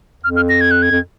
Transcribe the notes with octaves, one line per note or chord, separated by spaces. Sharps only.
F2 F6
F6
A#6
G#6
F#6
G#6
F2